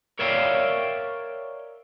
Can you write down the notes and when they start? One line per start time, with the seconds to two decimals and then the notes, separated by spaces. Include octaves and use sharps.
0.19 A#4 C#5 D5 E5 F5 G5